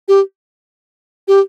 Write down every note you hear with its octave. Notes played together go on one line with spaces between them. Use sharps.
G4
G4